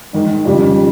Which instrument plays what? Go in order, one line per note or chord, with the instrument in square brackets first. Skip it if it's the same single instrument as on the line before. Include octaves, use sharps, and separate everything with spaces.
[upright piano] G#2 D#3 G#3
F2 C#3 G3